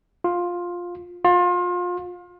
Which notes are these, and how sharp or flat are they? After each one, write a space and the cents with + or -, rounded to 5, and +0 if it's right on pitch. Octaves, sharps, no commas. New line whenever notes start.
F4 +10
F4 +30